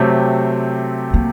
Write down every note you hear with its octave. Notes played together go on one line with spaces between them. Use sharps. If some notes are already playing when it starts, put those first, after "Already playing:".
Already playing: C3 F#3 A3 C4 G4
A#3